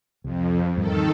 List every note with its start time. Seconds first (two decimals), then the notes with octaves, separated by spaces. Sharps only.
0.24 C2 F2
0.77 E2 G#2 D#3 G3 A4